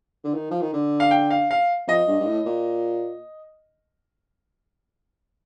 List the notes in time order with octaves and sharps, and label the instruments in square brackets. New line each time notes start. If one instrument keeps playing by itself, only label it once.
[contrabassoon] D3
D#3
F3
D#3
D3
[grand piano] F5
G5
F5
F5
[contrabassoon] F2 [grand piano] D#5
[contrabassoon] G2
G2
A2
A#2